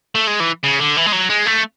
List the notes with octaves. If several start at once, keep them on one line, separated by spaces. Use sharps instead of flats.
A3
G#3
E3
C#3
D3
E3
G#3
F#3
G#3
A3